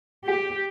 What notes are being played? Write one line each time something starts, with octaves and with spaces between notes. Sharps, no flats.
G4